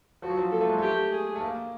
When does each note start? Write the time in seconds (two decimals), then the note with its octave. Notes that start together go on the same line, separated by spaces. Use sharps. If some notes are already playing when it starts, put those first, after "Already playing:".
0.22 F3 F#4
0.30 F#3
0.37 F3
0.51 A#3 A4
0.61 A3
0.69 G#3
0.78 A3 G4
1.11 G#4
1.35 A3
1.41 A#3